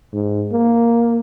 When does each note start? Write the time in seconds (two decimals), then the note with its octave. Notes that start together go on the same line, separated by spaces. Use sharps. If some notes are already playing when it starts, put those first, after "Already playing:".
0.13 G#2
0.52 A#3